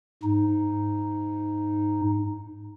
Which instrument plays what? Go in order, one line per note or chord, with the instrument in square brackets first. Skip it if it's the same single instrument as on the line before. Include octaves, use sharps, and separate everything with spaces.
[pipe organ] G#2 D#4